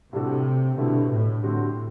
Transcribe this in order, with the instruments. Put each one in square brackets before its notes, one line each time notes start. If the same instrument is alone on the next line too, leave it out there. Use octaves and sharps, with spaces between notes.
[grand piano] A2 G3 D4 F#4 A4 [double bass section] C3
[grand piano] G2 D3 A3 E4 G4 [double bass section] B2
[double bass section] A2
[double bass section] A2 [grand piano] D3 G3 C4 F#4 A4